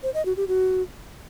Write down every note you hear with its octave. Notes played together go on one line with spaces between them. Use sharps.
C5
D#5
F#4
G4
F#4